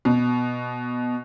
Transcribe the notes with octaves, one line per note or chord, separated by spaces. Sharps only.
B2